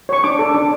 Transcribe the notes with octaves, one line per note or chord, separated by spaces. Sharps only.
C#5 C#6
D4 D6
A4
D4